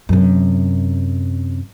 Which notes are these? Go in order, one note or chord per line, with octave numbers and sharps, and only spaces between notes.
F#2 C3